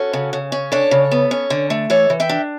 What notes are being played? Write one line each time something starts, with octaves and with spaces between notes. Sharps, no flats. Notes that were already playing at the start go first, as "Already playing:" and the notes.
Already playing: C#4 F#4 A4
C#3
C#3
C#4
D4 A4 C#5
C#3
B3
C#4
D3
A3
E3 A4 C#5
E3
E5 G5
D4